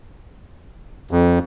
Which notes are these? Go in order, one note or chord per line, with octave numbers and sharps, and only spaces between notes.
F2